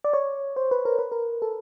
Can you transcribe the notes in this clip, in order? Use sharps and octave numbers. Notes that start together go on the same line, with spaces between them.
D5
C#5
C5
B4
A#4
B4
A#4
A4